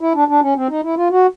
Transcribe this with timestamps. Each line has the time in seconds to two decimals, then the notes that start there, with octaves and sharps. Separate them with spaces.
0.01 E4
0.14 D4
0.28 D4
0.42 C#4
0.55 C4
0.69 D#4
0.83 E4
0.96 F4
1.10 F#4